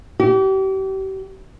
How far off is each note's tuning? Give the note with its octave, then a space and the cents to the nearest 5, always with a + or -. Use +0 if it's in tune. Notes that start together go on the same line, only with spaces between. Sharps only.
G4 -35